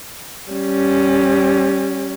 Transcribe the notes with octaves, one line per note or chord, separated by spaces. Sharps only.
G3 C#4